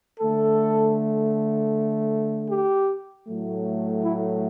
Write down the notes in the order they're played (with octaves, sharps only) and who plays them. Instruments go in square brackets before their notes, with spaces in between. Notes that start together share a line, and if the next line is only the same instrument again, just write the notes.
[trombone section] D3 A3 A4
G4
A2 F#3 A3
E4